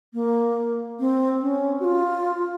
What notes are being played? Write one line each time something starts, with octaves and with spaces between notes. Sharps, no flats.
A#3
C4
C#4
F#4
F4